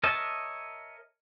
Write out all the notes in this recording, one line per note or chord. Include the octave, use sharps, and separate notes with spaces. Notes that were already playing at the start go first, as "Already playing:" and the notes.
A#4 C#5 D#5 E5 A5